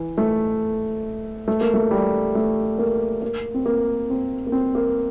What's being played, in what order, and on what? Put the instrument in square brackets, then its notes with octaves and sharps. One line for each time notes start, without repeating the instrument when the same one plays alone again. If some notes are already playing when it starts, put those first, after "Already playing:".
Already playing: [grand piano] E3
A3
A3
A#3
A3
G3
A3
A#3
A#3
C4
A#3
C4
A#3
C4
A#3